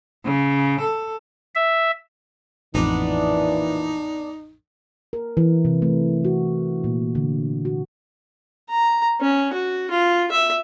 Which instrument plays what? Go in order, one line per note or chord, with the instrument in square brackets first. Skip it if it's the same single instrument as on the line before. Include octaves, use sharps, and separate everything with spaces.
[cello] C#3
A4
[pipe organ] E5
[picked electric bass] A1 F2 [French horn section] A#2 E3 [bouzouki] B3 D4 [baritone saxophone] D#4
[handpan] A#4
E3
C3
A3
F#4
A#2
D3
F#4
[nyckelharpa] A#5
C#4
F#4
F4
E5